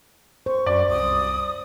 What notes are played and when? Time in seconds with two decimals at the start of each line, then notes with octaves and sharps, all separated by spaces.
0.46 C5 C#6
0.67 F#2 D5
0.89 C2 D#6